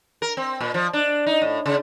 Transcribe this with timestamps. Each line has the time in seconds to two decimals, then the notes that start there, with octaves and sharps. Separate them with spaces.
0.22 A#4
0.37 C4
0.60 A#2
0.74 F3
0.93 D4
1.26 D#4
1.42 A2
1.66 C#3